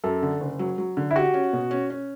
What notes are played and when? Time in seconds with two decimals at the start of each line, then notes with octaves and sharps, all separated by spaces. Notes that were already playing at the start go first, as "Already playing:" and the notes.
0.04 F#2 A4
0.22 D3
0.41 F#1
0.59 F#3
0.78 F#3
0.97 D3
1.11 E4
1.16 F#4 G4
1.34 C#4
1.53 B2
1.71 C#4
1.90 C#4